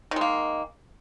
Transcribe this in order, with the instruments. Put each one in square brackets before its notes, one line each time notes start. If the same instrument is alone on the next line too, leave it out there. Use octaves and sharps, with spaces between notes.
[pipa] D#3
G#3
A#3